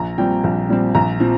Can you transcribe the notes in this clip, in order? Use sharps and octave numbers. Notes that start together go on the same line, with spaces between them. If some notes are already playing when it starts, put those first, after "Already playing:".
Already playing: A#1 A#5
A#2 G3 C4 G5
A#1
A#2 G3 C4
A#1 A#5
A#2 F3 C4